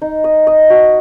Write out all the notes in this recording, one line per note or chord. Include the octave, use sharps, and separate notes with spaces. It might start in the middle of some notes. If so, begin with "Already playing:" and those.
D#4
D#5
D#5
F#4